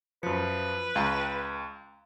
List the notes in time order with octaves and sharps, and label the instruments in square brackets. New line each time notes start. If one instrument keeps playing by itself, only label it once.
[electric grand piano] F#2 F3 [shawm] B4 [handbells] C#7
[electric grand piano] C#2 [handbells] F5 G5 A#5